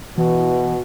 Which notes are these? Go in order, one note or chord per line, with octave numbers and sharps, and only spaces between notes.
B2 E3 F#4